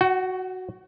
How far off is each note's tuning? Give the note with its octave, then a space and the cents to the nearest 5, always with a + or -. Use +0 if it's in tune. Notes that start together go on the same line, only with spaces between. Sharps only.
F#4 +0 F#5 +40